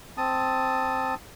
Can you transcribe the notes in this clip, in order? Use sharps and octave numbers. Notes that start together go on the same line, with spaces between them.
C4 A5 D#6